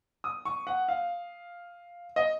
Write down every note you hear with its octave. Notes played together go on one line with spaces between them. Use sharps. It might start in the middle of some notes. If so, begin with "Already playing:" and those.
D#6
C#6
F#5
F5
D#5